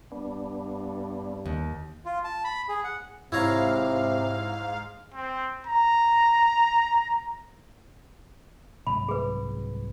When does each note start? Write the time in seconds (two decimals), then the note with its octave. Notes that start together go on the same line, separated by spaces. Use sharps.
0.12 G2 B3 D4
1.46 D#2
2.06 F4
2.24 A5
2.44 B5
2.69 G#4
2.84 F#5
3.32 G#2 C3 E4 C#5 F5 A#5
5.14 C4
5.67 A#5
8.87 C2 G#2 F#3 B5
9.09 G#4 B4